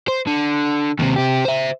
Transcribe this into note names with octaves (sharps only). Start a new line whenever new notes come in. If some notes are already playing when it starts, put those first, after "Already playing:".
C5
D3
D#2 C3
C3 G4
C5 E5